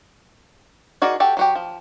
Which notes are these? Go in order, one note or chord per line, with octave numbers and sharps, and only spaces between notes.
D#4 F#4 G#4 A#4 D5
F#4 G4 A4
F#3 F#4 G4
F3